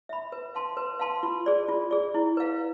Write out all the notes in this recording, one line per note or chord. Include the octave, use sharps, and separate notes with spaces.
E5 B5
B4
F5 A5 C6
B4
F5 A5 C6
F4
G#4 D5
F4
G#4 D5
E4
B4 F5